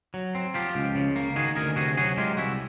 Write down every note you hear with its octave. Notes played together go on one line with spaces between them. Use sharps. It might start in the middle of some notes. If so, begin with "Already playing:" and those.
F#3
C4
F3 F4 G4
C#2
C#3
A#3
D#3 F#4 G#4
D2 G#4 A#4
C3 F#4 G#4
F#3 F#4 G#4
G#3 F4 G4
C2 E4 F#4